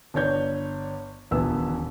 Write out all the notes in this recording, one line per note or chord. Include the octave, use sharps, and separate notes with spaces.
G1 D4 C#5 G6
D#1 D3 E3 B3 E6